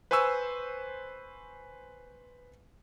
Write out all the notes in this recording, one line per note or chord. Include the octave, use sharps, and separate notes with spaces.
B4 C5 G#5 C#6 E6